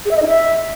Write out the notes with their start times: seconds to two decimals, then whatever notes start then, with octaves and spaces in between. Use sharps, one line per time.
0.05 G#4
0.11 E5
0.17 D#5
0.22 D#4
0.28 E5